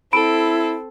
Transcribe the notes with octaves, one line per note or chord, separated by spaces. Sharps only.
C4 E4 A4 B5 D7